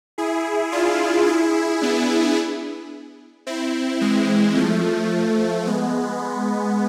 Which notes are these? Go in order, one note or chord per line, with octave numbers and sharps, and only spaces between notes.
E4 G#4
D4 F4
E4 G#4
B3 D4
C4 E4
E3 G#3
F3 A3
G#3 B3